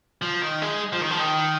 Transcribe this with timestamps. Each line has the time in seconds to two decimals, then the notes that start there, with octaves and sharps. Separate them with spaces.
0.22 F3
0.42 D#3
0.62 G#3
0.92 F3
1.01 D#3
1.11 F3
1.20 D#3